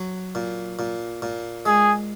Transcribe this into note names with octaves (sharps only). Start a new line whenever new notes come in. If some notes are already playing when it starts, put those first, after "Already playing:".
Already playing: F#3
A#2
A#2
A#2
G#3 G#4